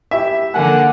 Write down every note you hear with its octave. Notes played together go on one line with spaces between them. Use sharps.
E4 G4 E5
D3 F3 A#3 A#4 F#5 G#5